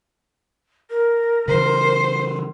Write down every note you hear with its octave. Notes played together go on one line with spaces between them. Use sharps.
A#4
C#3 E3 C5